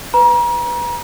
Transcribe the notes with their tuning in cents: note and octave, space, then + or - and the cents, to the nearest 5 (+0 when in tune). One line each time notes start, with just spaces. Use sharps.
B4 +10 A#5 +35